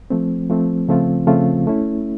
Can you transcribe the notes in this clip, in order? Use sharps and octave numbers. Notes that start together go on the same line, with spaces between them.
F3 A3 C4
F3 A3 C4
C#3 F3 A3 C4 F4
C#3 F3 A3 C4 F4
A3 C#4 E4